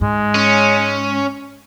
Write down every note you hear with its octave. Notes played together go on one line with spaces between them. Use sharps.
G#2 G#3
C#4